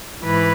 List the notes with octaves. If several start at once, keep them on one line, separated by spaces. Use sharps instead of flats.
G#2 E3 B4